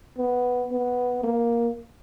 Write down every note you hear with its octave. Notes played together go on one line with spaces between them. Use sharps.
B3
B3
A#3